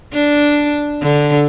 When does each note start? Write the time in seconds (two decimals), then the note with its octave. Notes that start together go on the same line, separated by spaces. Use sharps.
0.13 D4
1.01 D3